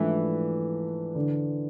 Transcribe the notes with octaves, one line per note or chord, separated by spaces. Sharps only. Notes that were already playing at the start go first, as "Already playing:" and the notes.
Already playing: G#2 E3 F3 A3 D4
D3